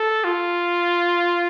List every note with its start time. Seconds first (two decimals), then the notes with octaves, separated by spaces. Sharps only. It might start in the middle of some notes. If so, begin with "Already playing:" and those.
Already playing: A4
0.24 F4